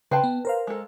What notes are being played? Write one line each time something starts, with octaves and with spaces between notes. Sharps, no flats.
C#3 B4 G5 A5 C6
B3
A#4 C5 F5
G#3 A4